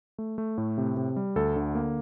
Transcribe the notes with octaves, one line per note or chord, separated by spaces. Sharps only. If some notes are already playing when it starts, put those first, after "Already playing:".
A3
A3
A2
C3
C3
G3
D2 A4
D3
A#3